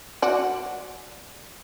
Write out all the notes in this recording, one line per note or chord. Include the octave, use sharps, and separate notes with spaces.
F#4 D5